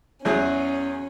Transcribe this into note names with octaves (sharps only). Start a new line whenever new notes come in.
E2 F#3 C#4 G#4